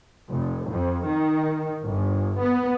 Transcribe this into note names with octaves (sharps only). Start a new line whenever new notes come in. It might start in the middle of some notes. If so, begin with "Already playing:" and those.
F1
F2
D#3
G1
B3